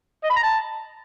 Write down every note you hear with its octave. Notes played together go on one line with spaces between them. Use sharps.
D#5
B5
A#5
A5